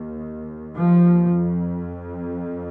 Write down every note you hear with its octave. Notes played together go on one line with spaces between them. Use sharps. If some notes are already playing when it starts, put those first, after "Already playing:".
Already playing: D#2
F3
F2